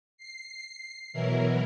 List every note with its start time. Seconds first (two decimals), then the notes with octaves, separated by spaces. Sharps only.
0.17 C7
1.13 B2 E3 F#3 E4 A#4